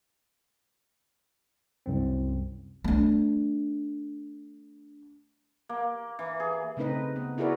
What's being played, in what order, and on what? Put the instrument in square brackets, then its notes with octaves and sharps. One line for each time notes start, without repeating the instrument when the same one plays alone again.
[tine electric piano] C2 F#2 C4
[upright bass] A3 D4
[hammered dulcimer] A#3
E3
G#4
[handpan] C#3 A3 C4 D#4 B4 D#5
B3
E4 F#4 G#4 A#4 B4 D5